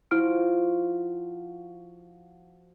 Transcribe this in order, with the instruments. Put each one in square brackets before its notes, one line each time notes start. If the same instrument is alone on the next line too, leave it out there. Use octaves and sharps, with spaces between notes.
[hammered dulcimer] F3 F#4 [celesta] E4 F6 D7